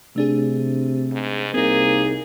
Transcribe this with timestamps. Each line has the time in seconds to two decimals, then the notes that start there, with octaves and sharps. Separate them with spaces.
0.16 C3 A3 D4 G#4
1.12 G#2
1.54 C2 A#3 C4 D#4 G#4